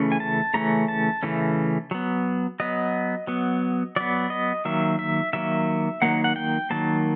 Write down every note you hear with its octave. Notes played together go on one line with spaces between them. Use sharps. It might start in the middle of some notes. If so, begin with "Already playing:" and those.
Already playing: C#3 E3 A3 C#4
G#5
A5
C#3 E3 A3 C#4 A#5
A5
C#3 E3 A3 C#4
F#3 B3
F#3 B3 D#5
F#3 B3
F#3 B3 D5
D#5
D#3 F#3 A#3 E5
E5
D#3 F#3 A#3 E5
D#3 F#3 A#3 F#5
F#5
G5
D#3 F#3 A#3 A5